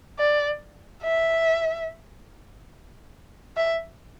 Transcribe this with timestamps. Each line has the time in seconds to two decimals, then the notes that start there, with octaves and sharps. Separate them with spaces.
0.19 D5
1.03 E5
3.57 E5